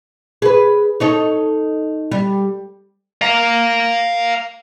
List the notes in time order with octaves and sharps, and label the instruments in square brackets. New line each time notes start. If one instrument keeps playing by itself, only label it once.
[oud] G#4 B4
D#4 A4 C#5
G3
[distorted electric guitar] F5 A#5